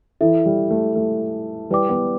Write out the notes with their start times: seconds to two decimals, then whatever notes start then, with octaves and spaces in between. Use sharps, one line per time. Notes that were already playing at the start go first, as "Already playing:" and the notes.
0.21 E3 E4 A4 E5
0.46 G3
0.71 A3
0.96 A3
1.70 G3 E4 B4 D5 G5 D6
1.89 B3